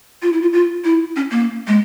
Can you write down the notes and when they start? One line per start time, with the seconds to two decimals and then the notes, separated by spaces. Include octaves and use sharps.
0.22 F4
0.32 E4
0.42 F4
0.53 F4
0.85 E4
1.16 C#4
1.31 A#3
1.67 G#3